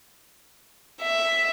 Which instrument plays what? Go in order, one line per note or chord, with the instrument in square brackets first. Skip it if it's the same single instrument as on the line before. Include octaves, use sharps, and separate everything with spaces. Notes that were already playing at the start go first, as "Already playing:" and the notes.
[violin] E5